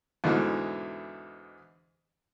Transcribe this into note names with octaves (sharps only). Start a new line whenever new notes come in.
E2 G#2 B2 D3 E3